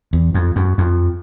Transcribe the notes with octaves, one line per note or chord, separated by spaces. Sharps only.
E2
F2
F#2
F2